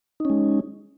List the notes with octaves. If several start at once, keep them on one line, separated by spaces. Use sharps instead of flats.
G#3 C#4 D#4